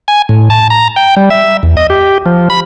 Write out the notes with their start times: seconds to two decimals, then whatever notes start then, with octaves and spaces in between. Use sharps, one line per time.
0.08 G#5
0.29 A2
0.50 A5
0.70 A#5
0.96 G5
1.17 G3
1.30 E5
1.63 E2
1.77 D#5
1.90 G4
2.26 F3
2.50 B5